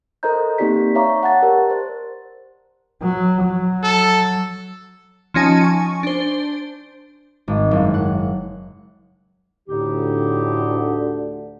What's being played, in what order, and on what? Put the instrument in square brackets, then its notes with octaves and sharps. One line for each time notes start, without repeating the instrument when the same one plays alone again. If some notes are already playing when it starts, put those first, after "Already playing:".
[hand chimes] A4 A#4 C5 D#5 A#5 G6
A#3 C4 D#4 G4 D5 B6
C#5 E5 F5 A#5 C#6 D6
F#5 A5 A6
G4 A#4 D5
C5
[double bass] F#3
F#3
[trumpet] A4
[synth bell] F3 C#4 D#4 G#5 A5
G#5 C#6
D4 C5
[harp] G#1
F#1
F#5
[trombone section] D2 D3 [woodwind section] A2 D#4 G4